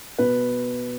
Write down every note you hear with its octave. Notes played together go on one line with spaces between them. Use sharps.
B2 B4